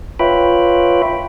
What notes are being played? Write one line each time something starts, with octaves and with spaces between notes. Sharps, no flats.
F4 B4 C#5 E5 G5 B5